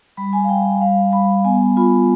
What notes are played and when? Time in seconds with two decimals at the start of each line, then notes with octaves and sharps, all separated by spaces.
0.17 G3 B5
0.33 G#5
0.44 F5
0.49 G3 G5
0.65 G5
0.81 G3 F5
1.12 G3 B5
1.45 B3 G#5
1.77 F4 B5